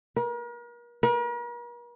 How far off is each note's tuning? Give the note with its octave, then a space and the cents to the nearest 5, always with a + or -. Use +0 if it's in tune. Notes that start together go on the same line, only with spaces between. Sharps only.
A#4 +40
A#4 +45